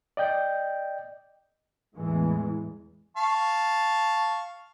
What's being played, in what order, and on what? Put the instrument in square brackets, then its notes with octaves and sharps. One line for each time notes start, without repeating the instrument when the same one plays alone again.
[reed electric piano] D5 D#5 G5 G6
[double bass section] E2 A2 E3 G#3
[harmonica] F5 A5 C#6